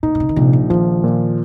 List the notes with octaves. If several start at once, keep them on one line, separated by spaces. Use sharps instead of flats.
A#2 D#4
A#2
C3
D#3
A#1 C3
F3
D#3 F3
A#2